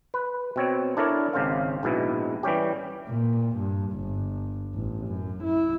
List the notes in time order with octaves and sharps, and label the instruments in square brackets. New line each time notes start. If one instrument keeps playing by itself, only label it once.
[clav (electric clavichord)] B4
B2 C4 C#5
D4 E4 A4 A#4 C#5 D5
G#1 C#3 C5 F5
A#1 G#2 B2 E4
E3 G3 C#4 G4
[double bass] A#2
G2
G1
A1
F#2
E4